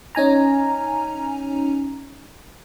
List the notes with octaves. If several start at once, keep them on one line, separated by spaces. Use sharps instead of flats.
C#4 D#4 G#5 A#5